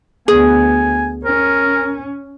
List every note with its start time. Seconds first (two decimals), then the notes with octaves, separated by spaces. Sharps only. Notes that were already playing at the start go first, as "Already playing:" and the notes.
0.28 D2 B3 G#4 G#5
1.25 C#4 A#4